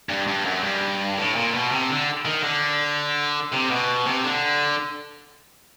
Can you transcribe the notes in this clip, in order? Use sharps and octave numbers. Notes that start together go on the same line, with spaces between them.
G2
G2
F#2
G2
A2
A#2
B2
C3
D3
D#3
D3
C3
B2
C3
D3